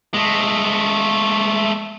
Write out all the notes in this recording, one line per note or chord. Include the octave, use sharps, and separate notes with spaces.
G#3 A3